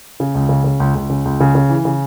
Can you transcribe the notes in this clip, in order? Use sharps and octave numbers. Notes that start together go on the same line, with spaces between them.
C#3
C#2
C#3
C#3
C#2
C#2
C#3
C#2
C#3
C#3
E3
C#3